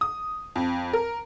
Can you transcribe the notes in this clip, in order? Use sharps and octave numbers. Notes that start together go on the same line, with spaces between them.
D#6
F2
A#4